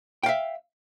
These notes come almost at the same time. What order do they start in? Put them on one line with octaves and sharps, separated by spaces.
G5 F5 E5